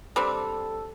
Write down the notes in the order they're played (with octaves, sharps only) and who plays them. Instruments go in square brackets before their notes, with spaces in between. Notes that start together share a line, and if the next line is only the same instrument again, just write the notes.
[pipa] G3 C4 D4 [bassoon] A4